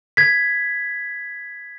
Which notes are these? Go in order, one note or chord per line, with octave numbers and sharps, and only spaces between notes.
G#6 B6